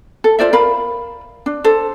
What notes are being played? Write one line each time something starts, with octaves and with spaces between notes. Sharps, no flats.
A4
F4 C5 D5 E5
A#4 F5 B5
D4
A4 C5